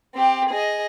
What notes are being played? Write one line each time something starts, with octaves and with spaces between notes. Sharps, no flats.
C4 G4
G#4 D#5